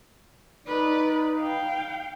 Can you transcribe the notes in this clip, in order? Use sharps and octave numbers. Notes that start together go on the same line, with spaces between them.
D#4 B4 D5
F5 G5